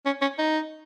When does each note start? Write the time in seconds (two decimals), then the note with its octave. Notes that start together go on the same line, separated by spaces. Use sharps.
0.06 C#4
0.21 C#4
0.39 D#4